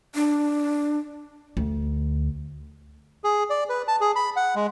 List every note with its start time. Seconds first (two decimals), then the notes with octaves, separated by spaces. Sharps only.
0.15 D4
1.57 D2
3.24 G#4
3.50 D5
3.69 B4
3.88 A5
4.01 G#4
4.16 B5
4.36 F#5
4.55 G#3